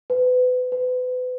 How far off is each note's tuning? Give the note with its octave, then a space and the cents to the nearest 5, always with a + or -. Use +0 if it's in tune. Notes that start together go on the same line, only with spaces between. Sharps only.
B4 +30
B4 +35